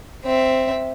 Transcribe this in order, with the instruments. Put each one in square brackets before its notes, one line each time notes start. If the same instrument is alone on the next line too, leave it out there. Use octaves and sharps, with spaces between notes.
[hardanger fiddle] C4 E5